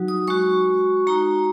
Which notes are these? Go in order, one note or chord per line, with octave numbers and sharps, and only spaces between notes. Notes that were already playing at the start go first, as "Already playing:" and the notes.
Already playing: F#3 D#4 F#4
D#6
G#3 F#4 C#6
G#3 D#4 F#4 A#5